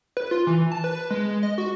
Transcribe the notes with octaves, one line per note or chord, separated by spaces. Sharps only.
B4
F4
E3
A5
B4
G#3
D#5
F#4